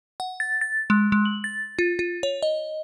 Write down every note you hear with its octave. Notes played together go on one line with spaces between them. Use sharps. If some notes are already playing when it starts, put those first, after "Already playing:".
F#5
A6
A6
G#3
G#3
F#7
A6
F4
F4
C#5
D#5